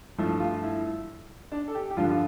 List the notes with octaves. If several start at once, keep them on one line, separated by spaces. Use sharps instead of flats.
G2 F3 A3 E4
F4
E4
D4
A4
G4
G4
G2 D3 F3 F4
F4